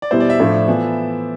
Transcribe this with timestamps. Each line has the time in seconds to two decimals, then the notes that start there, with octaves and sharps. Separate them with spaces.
0.02 D5
0.11 E2 B2 G3 B3 E4 C5
0.20 D5
0.30 E5
0.40 A2 F3 A3 D4 F4
0.68 E3 B3 F4 A4